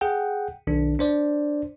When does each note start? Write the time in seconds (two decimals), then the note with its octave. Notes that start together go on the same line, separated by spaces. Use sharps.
0.01 G#4 F#5 G5
0.67 B1 D#3 D4
0.99 D4 C5 D5